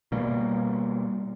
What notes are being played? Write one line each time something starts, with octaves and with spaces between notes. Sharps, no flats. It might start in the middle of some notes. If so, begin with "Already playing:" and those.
B2 G3 A#3